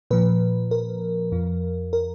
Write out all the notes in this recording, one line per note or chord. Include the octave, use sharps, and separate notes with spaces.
A#2 F3 B4
A#4
F2 F3
A#4